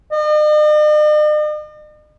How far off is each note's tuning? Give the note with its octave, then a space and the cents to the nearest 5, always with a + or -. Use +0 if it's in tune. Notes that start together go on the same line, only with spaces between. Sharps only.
D#5 -45